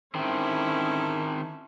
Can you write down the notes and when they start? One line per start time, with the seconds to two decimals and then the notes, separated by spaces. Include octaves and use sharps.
0.15 D#3 C4 C#4 E4 A4